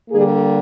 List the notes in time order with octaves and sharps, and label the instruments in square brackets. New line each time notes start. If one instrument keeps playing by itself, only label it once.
[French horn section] D3 G3 A#3 G#4